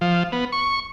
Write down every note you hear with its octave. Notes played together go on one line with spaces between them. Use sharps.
F3
B3
C#6